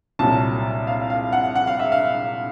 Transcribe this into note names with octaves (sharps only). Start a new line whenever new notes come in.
C2 A#2 F#3 A5
F5
F5
F#5
F#5
F5
E5
F5